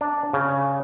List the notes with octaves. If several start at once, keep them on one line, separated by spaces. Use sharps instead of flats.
D4
C#3